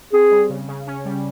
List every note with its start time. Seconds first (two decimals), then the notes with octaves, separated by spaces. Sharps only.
0.12 C4 G#4
0.31 G3
0.49 C#3
0.68 C#3
0.87 C#4
1.05 G3